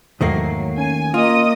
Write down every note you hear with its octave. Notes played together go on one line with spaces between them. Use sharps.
E2 G#2 D#3 F#3 A3 A#3 C7
C#4 G#5
A#3 F4 D#5 D#6